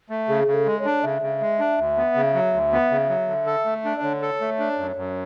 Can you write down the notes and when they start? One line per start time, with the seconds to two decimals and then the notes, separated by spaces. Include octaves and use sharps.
0.09 A3
0.28 C#3 G#4
0.47 C#3
0.53 A4
0.66 G#3
0.79 C#5
0.85 D4
1.03 C#3 E5
1.22 C#3
1.41 G#3
1.59 D4
1.78 D2
1.97 B3
2.15 C#3
2.34 F#3
2.53 D2
2.72 B3
2.91 C#3
3.09 F#3
3.28 D3
3.46 A4
3.65 A3
3.85 D4
3.96 D5
4.02 D3 C#5
4.22 A4
4.41 A3
4.59 D4
4.78 F#2
4.96 F#2